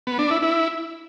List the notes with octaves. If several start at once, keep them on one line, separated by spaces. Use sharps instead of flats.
B3
D4
E4
E4